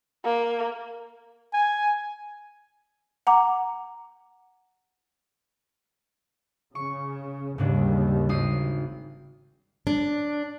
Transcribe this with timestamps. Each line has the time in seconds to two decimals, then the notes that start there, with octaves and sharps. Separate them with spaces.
0.25 A#3
1.53 G#5
3.27 F#5 A#5 D6
6.75 C#3 C#6
7.58 D#2 G#2 C#3 G3 D4
8.29 G#1 D#6 C7
9.87 D4